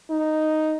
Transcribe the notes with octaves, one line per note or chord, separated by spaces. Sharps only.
D#4